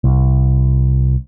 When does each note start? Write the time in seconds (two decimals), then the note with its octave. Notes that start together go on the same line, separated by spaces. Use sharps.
0.04 C2